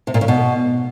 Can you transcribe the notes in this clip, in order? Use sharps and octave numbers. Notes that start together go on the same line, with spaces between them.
C3
A#2
C#3
B2